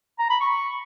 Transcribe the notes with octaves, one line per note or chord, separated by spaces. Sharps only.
A#5
B5
C#6